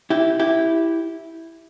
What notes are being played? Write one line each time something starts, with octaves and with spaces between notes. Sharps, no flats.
E4 G4
E4 G4